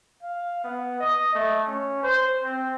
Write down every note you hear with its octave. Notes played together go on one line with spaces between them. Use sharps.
F5
B3
D#5
A3
C#4
C5
C4